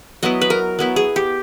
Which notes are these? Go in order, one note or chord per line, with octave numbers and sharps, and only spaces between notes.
F#3 B3 E4 D#5
B4
A#4
F#3 B3 E4
G#4
G4